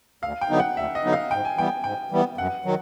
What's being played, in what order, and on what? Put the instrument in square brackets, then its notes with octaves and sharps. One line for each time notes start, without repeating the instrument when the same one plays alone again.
[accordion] D2 [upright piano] F5
[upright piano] G5
[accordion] D3 F#3 B3 D#4
[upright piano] F#5
[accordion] D2 [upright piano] E5
[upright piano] D#5
[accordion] D3 F#3 B3 D#4
[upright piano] F5
[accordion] G#2 [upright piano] G5
[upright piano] G#5
[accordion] E3 G3 B3 [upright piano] G5
[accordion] G#2 [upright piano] G5
[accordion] E3 G3 B3
[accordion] F#2 [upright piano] F#5
[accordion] D#3 F#3